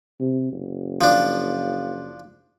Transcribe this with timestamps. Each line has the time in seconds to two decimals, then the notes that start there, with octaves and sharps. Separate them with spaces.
0.20 C3
0.52 F#1
1.01 F3 D4